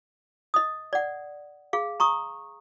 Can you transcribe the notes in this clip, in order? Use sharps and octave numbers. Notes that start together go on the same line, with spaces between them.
D#5 D#6
D5 F#5
G#4 F5
A#5 C#6 D#6